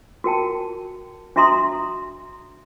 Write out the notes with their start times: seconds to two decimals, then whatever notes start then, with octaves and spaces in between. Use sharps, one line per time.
0.24 F#4 A#4 G5 A5
1.36 D4 F#4 E5 A#5 C6 D#6